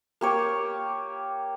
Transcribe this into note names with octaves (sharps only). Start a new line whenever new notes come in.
A#3 G4 C#5